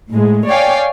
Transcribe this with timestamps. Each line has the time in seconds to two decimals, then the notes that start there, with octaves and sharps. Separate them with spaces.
0.10 A2 G#3
0.47 C#5 D5 F5 G5 G#5